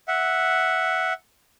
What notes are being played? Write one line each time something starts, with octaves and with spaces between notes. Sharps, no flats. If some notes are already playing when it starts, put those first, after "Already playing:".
E5 F#5